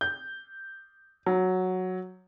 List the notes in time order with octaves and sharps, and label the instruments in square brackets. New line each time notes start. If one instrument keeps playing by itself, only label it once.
[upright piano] G6
F#3